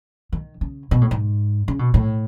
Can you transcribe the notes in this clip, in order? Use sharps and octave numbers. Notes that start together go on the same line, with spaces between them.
D#3
C#3
B2
A2
G#2
C#3
B2
A2